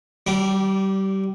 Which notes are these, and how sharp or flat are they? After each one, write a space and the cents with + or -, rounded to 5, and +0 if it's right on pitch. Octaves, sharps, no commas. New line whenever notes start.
G3 -25 D4 +0